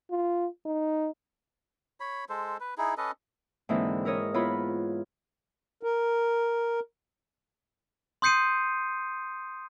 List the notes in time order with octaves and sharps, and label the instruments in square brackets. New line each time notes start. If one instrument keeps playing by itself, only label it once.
[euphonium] F4
D#4
[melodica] C#5 B5
G#3 A4 C5
B4
D#4 E4 G#4
C#4 A4 B4 D#5
[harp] G#2 D3 E3 A#3 C4 D#4
E4 A#4 C#5 D#5
B3 E4 F4 C#5 A#5 B5
[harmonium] A#4
[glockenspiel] C6 D#6 G6 C7 C#7 D#7